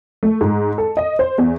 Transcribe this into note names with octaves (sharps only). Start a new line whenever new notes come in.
A3
G#2
A4
D#5
C5
E2